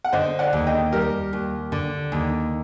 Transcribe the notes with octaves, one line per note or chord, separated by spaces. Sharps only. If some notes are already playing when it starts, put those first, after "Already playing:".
F#5
D3 C5 D#5
D5 F#5
D#2
D#5 G5
G3 G4 A#4
D#2
D3
D#2